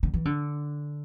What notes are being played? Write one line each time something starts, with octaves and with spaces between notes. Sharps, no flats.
D3
E3
D3